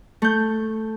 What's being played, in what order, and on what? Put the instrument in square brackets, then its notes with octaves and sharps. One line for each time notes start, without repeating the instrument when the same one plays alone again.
[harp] A3 G6